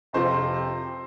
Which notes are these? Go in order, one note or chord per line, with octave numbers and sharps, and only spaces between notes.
F2 C3 F3 C5